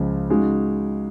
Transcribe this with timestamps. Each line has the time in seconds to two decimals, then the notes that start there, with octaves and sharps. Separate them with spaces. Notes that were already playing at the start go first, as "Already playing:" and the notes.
Already playing: C#2 C#3 F3
0.30 C#3 G#3 D#4 F#4